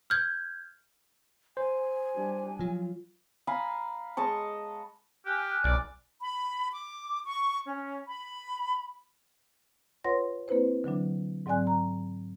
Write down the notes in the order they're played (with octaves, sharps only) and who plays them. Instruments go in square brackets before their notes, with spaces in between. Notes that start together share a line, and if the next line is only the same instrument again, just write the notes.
[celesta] F6 G6 G#6
[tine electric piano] C5 [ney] G#5
[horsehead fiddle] G3 D4
[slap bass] F3 F#3 [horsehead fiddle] F4
[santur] F5 G#5 A#5 B5
G#3 D#5 A5 C#6
[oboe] G4 [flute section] G#5 F6 F#6
[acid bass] B1 [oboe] D5
[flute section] B5
D6
C#6
C#4
B5
[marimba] F4 B4 C#5 F#5 C6 A#6
A#3 C4 E4 B4 C5
D3 E3 F#3 D4
G#2 F#3 C4 D5 G#5 F#6
A#5